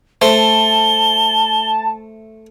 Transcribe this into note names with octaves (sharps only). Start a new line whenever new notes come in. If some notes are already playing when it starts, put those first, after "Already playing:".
A3 C5 A5 G7